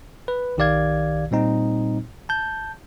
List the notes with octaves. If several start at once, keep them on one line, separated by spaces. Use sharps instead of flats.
B4
B1 D#3 G4 D5 F5 G#6
A#2 G3 C4 D#4
A5 G6